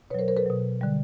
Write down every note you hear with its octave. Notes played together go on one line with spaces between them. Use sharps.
B2 F#3 A#4 B4 C5 C#5
A#4 C5
A4 B4
B2 F#3
D3 G3